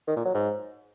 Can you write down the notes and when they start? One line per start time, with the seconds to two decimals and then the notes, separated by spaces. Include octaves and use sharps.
0.07 D#3
0.16 A#2
0.25 F#3
0.34 G#2